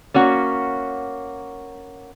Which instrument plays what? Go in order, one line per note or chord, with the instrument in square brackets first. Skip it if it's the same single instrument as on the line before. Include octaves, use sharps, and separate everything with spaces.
[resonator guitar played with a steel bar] A#3 C#4 F#4